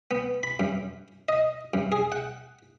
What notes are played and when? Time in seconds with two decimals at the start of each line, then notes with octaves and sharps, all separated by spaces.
0.11 B3
0.43 B5
0.60 F#2
1.29 D#5
1.74 F#2
1.92 G#4
2.12 F#5